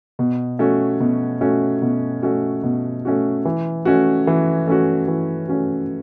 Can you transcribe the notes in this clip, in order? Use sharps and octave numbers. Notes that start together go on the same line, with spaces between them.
B2
A3 C#4 F#4
B2
A3 C#4 F#4
B2
A3 C#4 F#4
B2
A3 C#4 F#4
E3
A3 C#4 F#4
E3
A3 C#4 F#4
E3
A3 C#4 F#4